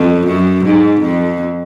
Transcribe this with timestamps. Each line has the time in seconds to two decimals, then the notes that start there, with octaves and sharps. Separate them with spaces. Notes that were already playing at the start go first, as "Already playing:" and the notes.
Already playing: F2
0.27 F#2
0.65 G#2
1.01 F2